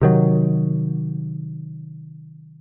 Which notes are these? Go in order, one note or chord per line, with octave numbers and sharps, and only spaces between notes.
C3 D#3 F#3